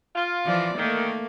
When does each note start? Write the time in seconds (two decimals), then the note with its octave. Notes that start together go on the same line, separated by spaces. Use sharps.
0.15 F4
0.46 E3 F3 D5
0.77 D#3 A3 A#3